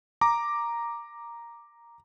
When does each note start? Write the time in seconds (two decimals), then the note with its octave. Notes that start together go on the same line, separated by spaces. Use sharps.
0.21 A#5 D6